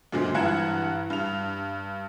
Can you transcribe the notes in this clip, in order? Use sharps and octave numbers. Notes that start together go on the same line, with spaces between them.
F#2 A#2 D3 G#3 C4
G2 E3 F#5 A#5 G#6 E7
G2 F7